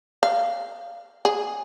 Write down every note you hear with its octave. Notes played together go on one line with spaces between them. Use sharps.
F5
G#4